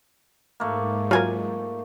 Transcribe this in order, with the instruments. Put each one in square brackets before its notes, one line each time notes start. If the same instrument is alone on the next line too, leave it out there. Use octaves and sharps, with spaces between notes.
[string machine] G#2 [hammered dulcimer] A3 A#3
[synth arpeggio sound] F#3 A#4 [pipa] F4 G#5